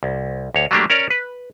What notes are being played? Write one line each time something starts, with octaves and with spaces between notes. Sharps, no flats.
C2
D2 C#5
F#3 G3 A3 A#3 D4 G4
C#4 A#4 C#5 D5
B4